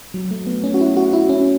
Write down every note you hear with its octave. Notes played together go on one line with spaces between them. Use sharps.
F#3
A3
B3
C#4
F#4
E4
F#4
E4
C#4